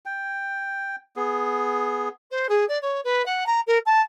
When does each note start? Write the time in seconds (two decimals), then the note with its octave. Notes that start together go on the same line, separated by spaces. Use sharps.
0.05 G5
1.16 B3 G#4
2.31 C5
2.49 G#4
2.68 D5
2.81 C#5
3.04 B4
3.25 F#5
3.46 A#5
3.67 A#4
3.85 A5